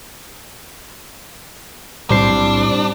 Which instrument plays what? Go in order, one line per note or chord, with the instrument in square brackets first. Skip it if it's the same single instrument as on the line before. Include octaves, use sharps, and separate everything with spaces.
[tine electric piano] B1 C5 C7 [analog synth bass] A2 [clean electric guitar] G3 C4 [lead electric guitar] D4